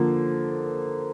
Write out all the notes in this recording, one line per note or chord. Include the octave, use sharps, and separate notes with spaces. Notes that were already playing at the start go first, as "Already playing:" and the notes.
Already playing: D3 F3 A#3